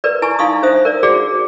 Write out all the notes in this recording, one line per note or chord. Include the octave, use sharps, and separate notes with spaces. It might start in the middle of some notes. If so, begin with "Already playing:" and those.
A#4 B4 D5
E4 G#5 A5 C#6
D#4 E4 F5 C6 C#6 D#6
D4 C5 E5 D#6
A#4 D5
F#4 G#4 D5 F#5